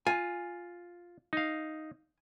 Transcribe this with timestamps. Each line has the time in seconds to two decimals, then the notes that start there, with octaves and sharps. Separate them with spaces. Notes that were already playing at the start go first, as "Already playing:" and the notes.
0.07 F4 G#5
1.33 D#4 F5